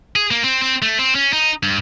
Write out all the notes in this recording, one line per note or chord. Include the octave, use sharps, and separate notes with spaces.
G#4
A#3
C4
C4
A3
C4
C#4
D#4
G2